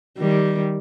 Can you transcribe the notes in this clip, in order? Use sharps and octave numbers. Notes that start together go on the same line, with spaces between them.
D#3 G3